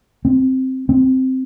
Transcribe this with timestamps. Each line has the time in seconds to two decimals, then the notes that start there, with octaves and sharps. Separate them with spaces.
0.25 C4
0.89 C4